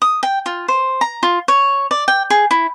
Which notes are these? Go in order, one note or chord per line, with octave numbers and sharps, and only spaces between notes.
D#6
G5
F4
C5
A#5
F4
C#5
D5
G5
G#4
E4